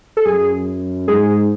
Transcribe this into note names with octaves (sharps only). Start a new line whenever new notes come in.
A4
F#2 G#4
G#2 G#4